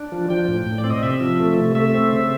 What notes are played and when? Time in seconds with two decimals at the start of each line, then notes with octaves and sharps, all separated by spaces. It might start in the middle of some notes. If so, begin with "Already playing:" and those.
Already playing: D4
0.12 F3
0.30 F3 G5
0.48 A2
0.67 A2
0.78 D5
0.84 C4
0.90 D#5
1.02 C3 E5
1.20 F3
1.40 A3
1.58 C3
1.75 A3 E5
1.94 C4
2.13 C#3